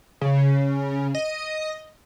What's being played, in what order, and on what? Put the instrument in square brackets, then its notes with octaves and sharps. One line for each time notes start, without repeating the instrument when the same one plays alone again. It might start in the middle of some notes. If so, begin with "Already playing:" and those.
[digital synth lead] C#3
D#5